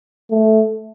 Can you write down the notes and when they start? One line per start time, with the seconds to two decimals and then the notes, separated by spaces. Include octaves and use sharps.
0.30 A3